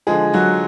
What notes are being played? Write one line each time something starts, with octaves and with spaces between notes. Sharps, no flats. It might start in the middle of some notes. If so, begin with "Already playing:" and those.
D3 F3 G#3 G#4
F#3 F#4